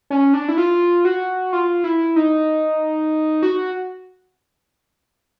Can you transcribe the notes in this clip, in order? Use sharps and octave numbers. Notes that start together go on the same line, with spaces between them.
C#4
D4
E4
F4
F#4
F4
E4
D#4
F#4